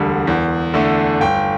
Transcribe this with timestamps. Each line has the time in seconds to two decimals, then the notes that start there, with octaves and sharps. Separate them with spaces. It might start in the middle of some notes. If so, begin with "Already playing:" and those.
Already playing: E1 D2 D3 G3 F#5
0.27 E2
0.74 D3 A3
1.20 G1 G5